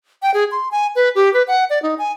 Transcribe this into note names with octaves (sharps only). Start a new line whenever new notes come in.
G5
G#4
C6
G#5
B4
G4
B4
F#5
D5
D#4
G#5